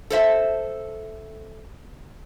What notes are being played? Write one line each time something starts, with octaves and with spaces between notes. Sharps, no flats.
A4 C5 E5